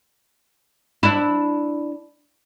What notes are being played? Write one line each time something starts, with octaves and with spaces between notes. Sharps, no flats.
D4 E4